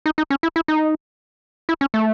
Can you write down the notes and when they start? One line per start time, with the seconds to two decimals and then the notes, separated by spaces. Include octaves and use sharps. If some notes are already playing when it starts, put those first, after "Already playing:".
0.06 D#4
0.18 D#4
0.30 C#4
0.43 E4
0.56 E4
0.68 D#4
1.69 E4
1.81 C#4
1.94 A3